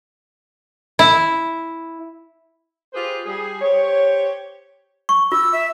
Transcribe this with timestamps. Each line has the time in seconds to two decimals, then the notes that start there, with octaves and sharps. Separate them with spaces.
0.99 E4
2.94 F4 G4 G#4 B4 C5
3.25 G3 G#4
3.61 G4 C5 C#5
5.09 C#6
5.32 F4 E6
5.53 E5